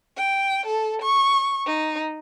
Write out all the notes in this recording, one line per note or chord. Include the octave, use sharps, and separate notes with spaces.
G5
A4
C#6
D#4